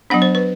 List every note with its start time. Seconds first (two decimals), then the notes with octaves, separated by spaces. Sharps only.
0.10 F#3 B3 D4 F#5
0.22 C5
0.35 B4